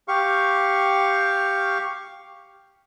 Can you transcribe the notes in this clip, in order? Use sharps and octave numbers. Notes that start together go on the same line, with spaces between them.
G4 F5 C#6